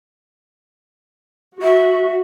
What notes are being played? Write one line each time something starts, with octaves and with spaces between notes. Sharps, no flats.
F#4 E5